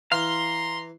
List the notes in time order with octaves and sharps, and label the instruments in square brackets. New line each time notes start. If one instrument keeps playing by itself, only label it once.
[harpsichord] E3 [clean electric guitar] F5 [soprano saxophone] A#5 [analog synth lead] C6